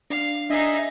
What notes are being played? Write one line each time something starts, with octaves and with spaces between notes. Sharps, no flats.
D4 F5
D4 D#4 G#4 D#5 E5